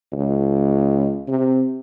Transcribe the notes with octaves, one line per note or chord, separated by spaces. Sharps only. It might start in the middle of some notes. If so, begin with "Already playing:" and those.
C#2
C3